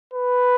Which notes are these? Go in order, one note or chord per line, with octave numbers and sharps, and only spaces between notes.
B4